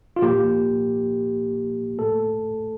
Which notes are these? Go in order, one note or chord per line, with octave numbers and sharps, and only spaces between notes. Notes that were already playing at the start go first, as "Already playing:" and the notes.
F4
A#2 F3 A#3 G4
A2 A3 A4